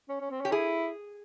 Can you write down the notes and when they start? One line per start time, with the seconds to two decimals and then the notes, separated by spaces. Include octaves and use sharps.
0.09 C#4
0.20 C#4
0.30 C4
0.41 C#4 G4
0.51 E4 G#4